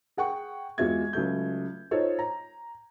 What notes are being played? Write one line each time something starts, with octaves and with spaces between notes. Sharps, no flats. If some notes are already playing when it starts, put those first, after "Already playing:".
G#4 F#5 G5 C#6
E2 G#3 F4 F#4 E5 G#6
C#2 F#3 A3 G6
D#4 F4 A4 C5 C#5
A#5